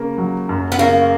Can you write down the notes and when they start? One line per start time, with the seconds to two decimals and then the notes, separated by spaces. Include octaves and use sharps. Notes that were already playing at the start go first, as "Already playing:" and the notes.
Already playing: C#3 A#3
0.18 F#3
0.49 F#2
0.72 B3
0.78 C#3 A#3